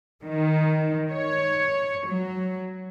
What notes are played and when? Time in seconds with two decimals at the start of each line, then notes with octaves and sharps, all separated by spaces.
0.24 D#3
1.11 C#5
2.06 F#3